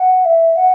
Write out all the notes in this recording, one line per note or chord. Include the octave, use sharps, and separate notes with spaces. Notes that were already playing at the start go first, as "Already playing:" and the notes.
Already playing: F#5
E5
F#5